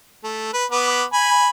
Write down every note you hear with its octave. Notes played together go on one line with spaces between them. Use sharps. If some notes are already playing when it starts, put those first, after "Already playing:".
A3
B4
B3 B4 D6
G#5 B5